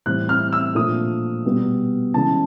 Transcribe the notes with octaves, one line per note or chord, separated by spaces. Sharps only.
A2 E3 G3 C4 F#6
F6
E6
A#2 F3 A3 D4 D#6
B2 G3 B3
C#3 E3 G#3 C#4 A5